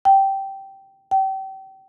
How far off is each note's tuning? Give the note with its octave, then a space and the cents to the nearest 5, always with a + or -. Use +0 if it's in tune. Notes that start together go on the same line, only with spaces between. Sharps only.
G5 -10
G5 -30